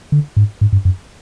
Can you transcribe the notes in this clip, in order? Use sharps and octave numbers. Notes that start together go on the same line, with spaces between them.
D3
G#2
G#2
G2
F#2